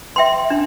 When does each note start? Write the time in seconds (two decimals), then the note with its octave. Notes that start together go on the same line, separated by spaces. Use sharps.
0.16 E5 G5 C6
0.50 D4